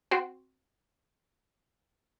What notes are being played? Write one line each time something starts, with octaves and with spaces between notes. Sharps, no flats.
C4 F#4